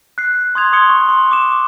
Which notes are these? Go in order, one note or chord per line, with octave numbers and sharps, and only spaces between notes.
F#6 C7
C6 D#6 G#6 F7
C6 D#6 G#6 C#7 G7
C#6
C6
D6 E7